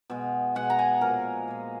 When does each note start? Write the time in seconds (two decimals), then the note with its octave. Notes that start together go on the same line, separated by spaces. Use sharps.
0.10 B2 G#3
0.55 B2 G#3 F#5
0.70 A#5
0.79 G#5
1.01 A#2 F3 G#3 A#4
1.48 A#2 F3 G#3